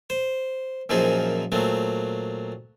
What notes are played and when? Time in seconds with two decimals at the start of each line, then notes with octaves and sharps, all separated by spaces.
0.10 C5
0.89 F#2 A#2 F3 C4 D#4 G#4
1.52 A#2 F#3 A3 C4